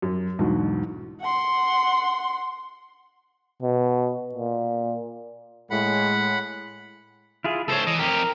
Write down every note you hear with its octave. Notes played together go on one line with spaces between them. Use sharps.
F#2
B1 E2 G#2 B2 D3
F#5 C6
B2
A#2
A2 G#3 F#5 B5
E4 F4 G#4
C#2 A4 C5 C#5
E3 D#5
F2 G4 A#4